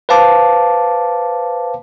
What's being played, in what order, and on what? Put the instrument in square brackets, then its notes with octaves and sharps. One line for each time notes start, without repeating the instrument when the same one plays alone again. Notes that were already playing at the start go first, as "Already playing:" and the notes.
[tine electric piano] B4 C5 F5 A5 D6